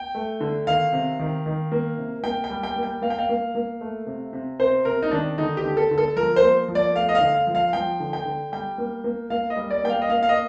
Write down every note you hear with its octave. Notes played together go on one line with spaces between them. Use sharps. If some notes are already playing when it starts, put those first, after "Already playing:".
Already playing: G5
A3
D3
D#3 F5
C3
D#3
D#3
A#3
C3
A#3 G5
G5
G3
G5
A#3
G5
A#3 F5
G5
F5
A#3
A#3
A3
C3
C3
C3 C5
C3 A#4
D#4
D#3 D4
D3 D#4
G4
D3
A4
D3
A4
F3 A#4
C5
A#3
F3
D5
A3 F5
D#5
F5
D3
F5
F3
F5
F3 G5
D3
G5
D3
G3 G5
A#3
A#3
A#3 F5
D#5
G3
D5
A#3 G5
F5
D#5
A#3 F5
F5
D#5